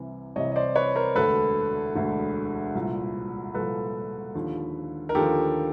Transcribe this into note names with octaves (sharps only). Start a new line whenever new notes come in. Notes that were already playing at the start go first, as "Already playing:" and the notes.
Already playing: C2 C3 E3
C2 C3 E3 C#5 D#5
D#5
C5 D5
B4 C#5
A#4 C5
E1 D2 D3 A4 B4
E1 D2 D3
C2 A#2 F3
C2 A#2 F3 A4 B4
D#2 D3 F3
A#4
D#2 D3 F3 G4 A4